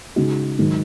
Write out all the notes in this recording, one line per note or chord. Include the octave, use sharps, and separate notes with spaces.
C#3 G#3 D#4 F#4
G#2 D#3 F#3